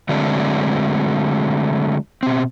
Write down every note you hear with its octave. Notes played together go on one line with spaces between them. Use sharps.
D3 F#3 G#3 A3 C4 D4
B2 C4